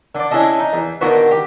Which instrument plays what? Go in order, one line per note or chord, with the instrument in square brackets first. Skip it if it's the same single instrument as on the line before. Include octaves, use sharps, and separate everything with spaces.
[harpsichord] D3 D5
C#4 D4 E4 G#4 A4 D#5
D#4
E2
A#2 D3 D#3 B3 F#4
G4